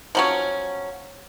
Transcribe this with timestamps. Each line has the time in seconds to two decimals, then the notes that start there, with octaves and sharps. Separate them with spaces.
0.15 F3 F#3 C#4